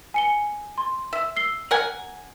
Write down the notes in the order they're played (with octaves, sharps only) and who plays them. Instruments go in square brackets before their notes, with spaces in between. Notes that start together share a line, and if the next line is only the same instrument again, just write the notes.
[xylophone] G#5 C#7 G7
C6
[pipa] E5
[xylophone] E6 C7 G7
[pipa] A#4 F#5 G#5